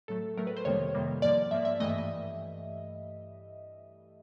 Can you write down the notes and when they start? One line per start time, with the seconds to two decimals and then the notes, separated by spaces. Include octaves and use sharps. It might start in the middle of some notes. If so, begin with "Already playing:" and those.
0.08 A2 F#3 A3 A4
0.37 A2 F#3 A3 A#4
0.47 B4
0.57 C5
0.65 F2 C3 D#3 G3 A#3 C#5
0.94 F2 C3 D#3 G3 A#3
1.22 G#2 F3 A#3 D5
1.51 G#2 F3 A#3 E5
1.65 E5
1.80 G2 E3 A3 D#5
1.89 E5
1.98 D#5